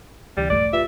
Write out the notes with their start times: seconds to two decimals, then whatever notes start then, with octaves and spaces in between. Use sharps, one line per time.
0.37 D2 C3 E3 G3
0.50 A#1 G2 A3 D5
0.73 F4 G4 B4 E5